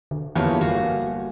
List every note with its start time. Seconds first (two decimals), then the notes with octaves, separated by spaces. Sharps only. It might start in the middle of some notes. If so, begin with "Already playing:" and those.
0.11 D3
0.36 E2 F3 A#3 G4 B4 C#5
0.61 G1 F#4 F5